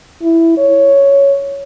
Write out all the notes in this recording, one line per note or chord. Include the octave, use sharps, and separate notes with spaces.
E4
C#5